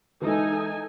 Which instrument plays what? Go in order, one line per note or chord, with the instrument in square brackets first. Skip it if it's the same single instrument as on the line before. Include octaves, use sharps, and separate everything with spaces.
[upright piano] E3 G#3 [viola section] D#4 A4 G#5